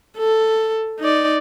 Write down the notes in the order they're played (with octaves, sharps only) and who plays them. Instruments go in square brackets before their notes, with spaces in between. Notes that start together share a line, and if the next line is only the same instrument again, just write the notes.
[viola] A4
D#4 D5